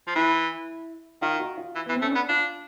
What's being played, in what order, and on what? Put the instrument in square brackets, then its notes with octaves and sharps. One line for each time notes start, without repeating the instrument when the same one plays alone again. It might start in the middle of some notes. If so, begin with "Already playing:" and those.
[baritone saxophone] F3
[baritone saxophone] E3 [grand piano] E4
[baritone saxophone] D#3 [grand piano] F4
[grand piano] F#4
F4
[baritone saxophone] E3
[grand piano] B3
[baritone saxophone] E3
[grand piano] C4
[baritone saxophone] A3 [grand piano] C#4
[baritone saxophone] B3 [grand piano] D4
[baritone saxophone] D4 [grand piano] F4